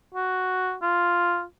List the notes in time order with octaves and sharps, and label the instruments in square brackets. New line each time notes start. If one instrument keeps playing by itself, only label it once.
[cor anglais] F#4
F4